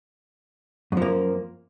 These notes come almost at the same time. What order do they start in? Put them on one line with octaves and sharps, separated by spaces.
F#2 F3 A#3